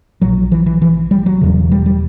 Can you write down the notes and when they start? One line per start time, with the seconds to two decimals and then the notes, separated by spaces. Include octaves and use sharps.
0.21 A#1 A#2 F#3
0.52 E3
0.66 E3
0.82 E3
1.11 G3
1.26 F#3
1.41 E1 E2 C#3
1.72 G3
1.86 G3